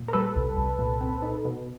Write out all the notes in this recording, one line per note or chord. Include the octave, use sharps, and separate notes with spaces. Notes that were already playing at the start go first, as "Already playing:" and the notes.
Already playing: A#2
A#4
G3 A4 B4
C2
C2
A#2
C4
D#4
B2